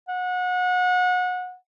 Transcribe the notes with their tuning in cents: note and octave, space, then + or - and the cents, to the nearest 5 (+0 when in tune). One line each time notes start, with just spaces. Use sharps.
F#5 -30